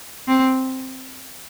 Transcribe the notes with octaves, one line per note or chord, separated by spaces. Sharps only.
C4